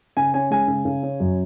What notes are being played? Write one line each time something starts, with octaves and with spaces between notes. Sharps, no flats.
C#3 G#5
C#4 G#5
G#3 G#5
C#3
C#3
C#4
F#2